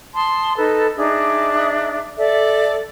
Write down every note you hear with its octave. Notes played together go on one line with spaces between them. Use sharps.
A5 C6 D#6
D#4 A4 B4
D4 D#4 G#4 E5
A4 D5 E5